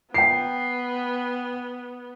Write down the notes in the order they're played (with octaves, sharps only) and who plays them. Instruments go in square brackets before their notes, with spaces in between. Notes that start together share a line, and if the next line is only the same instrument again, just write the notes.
[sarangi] B3 [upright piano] G5 C7